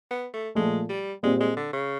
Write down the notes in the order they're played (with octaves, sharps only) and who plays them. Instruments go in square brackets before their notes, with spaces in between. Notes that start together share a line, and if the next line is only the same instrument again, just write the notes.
[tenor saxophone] B3
A3
[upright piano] A#2 F3 A3 [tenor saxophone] G#3
[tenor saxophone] G3
[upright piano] A#2 G3 C4 [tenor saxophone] G#3
[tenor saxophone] G#3
D3
C#3